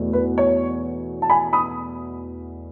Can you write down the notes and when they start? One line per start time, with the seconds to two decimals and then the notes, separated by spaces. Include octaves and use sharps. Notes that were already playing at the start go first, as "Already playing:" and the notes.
Already playing: E2 B2 A3
0.13 B4
0.38 C#5
1.22 A5
1.30 G#5 B5
1.53 B5 D#6